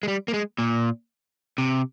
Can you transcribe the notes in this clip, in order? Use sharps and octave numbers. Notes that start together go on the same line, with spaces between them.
G#3
G3
A#3
G#3
A#2
C3